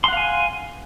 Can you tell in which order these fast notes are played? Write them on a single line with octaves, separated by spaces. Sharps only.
C6 F#5 F5 G#5